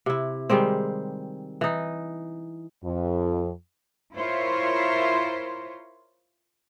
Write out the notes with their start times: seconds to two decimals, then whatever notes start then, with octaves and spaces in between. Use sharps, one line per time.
0.06 C3 E4
0.50 D#3 G3 G#3 C4
1.61 E3 D#4
2.84 F2
4.14 E4 F4 A#4 C5 C#5 E5